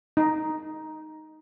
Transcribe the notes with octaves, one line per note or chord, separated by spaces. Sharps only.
D#4